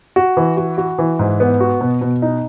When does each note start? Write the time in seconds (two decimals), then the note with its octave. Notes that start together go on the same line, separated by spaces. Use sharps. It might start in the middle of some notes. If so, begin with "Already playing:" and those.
0.16 F#4
0.37 E3
0.57 F#4
0.78 F#4
0.99 E3
1.19 G#2
1.40 B3
1.60 F#4
1.81 B2
2.01 B2
2.22 D#4